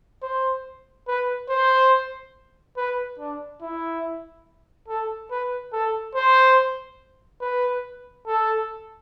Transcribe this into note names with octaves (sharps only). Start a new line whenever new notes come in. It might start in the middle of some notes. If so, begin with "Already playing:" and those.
C5
B4
C5
B4
D4
E4
A4
B4
A4
C5
B4
A4